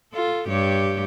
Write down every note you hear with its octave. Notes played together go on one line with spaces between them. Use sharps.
F4 A4
G2 G4 C#5